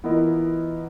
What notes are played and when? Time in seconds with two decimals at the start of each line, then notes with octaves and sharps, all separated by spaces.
0.04 E3 B3 E4 F4 A#4 D#5